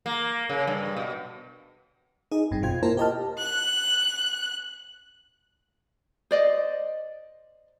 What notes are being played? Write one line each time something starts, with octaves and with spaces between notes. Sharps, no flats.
A#3
C#3
G2
B2
D#4 G#4 D#5
G#1 G2 C4
F2 B2 F4 C5 G5 G#6
A#3 E4 F4 A#4 C5 A5
G4 A#4 D#5 G5 A5 F6
F#6
C5 D5 D#5